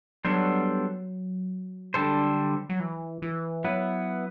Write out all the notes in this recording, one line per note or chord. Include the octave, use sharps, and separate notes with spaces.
F#3 G3 B3 D4 A4 C5
D3 G3 D4 A4 C5
F#3
E3
E3
F#3 B3 E4 B4